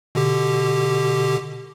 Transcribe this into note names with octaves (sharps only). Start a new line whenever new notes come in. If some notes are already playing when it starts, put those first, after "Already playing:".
B2 D3 G4